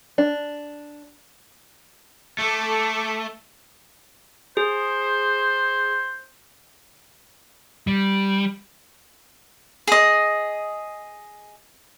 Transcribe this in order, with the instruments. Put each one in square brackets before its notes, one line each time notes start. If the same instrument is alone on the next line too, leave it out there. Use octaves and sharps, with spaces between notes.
[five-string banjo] D4
[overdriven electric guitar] A3 [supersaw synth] A4 D6
[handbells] G#4 [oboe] C5
[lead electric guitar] G3
[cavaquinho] G#4 D#5